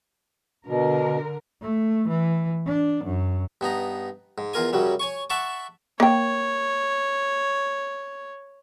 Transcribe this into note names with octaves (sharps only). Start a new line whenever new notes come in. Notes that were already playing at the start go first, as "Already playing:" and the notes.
B2 D3 A#4
A3
E3
D4
F#2
G2 B3 D#4 A#5
G#2
E2 F4 A#4 G#5
F#2 C#3 F#3 G3
C#5 G#5 C#6
E5 F#5 A5 C#6 D6
A#3 C#5 G5